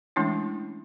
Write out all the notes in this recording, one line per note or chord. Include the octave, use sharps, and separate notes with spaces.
E3 G#3 A3 C#4 D4 E4